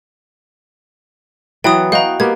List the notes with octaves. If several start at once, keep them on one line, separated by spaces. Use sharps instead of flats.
E3 F#3 B3 G5 D#6
F#4 D#5 F5 G5 A#5
A#3 B3 G4 G#6